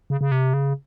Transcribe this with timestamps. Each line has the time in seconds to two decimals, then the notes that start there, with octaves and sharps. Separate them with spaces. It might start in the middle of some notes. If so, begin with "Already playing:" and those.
0.10 C#3
0.21 C#3
0.32 C3
0.54 C#3